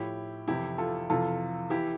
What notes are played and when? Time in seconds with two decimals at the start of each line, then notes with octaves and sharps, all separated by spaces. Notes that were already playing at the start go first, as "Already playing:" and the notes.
Already playing: A2 F3 E4 G4
0.48 F2 C3 E3 E4 G4
0.78 F4 A4
1.10 F2 C3 E3 F4 A4
1.70 E3 E4 G4